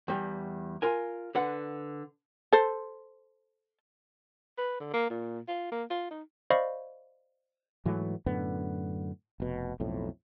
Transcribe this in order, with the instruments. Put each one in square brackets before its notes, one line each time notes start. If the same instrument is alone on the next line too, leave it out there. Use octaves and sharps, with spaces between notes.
[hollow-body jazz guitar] E2 G3
F4 A#4 G#5
D3 B4 F#5
[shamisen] A4 C5
[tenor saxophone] B4
D3
A#3
A#2
F4
A#3
F4
D#4
[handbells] C5 D5 D#5 F5 B5 C#6
[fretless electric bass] G#2 E3 F#3 A3
F#2 A2 D3 B3
F1 B2
B1 F2 A2